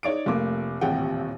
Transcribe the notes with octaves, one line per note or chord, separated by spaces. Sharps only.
D#4 C#5 D5 D7
F1 A3 A#3 D6
D#1 A1 C3 F#5 G5